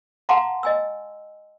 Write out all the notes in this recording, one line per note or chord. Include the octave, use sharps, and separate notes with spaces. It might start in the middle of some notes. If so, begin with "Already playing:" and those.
F5 F#5 A5 A#5 C6 D6
D#5 G#5 E6